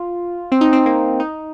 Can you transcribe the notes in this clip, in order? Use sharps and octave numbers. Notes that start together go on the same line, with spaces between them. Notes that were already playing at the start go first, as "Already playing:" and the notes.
Already playing: F4
C4
D#4
C4
A#3
D#4